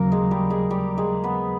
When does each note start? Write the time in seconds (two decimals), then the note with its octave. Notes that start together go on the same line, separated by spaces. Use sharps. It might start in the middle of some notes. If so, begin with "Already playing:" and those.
Already playing: D#2 C#3 F#3 A#3 A#4
0.12 G#3 G#4
0.31 G3 G4
0.50 G#3 G#4
0.71 G3 G4
0.97 G#3 G#4
1.24 B3 B4